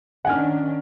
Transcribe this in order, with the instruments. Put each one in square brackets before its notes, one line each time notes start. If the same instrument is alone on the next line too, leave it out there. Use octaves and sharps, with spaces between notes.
[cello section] D#3 C#4 D4 [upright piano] F#5 G#5 F6